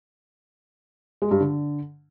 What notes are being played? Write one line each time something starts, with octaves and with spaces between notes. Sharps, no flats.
G#3
G2
D3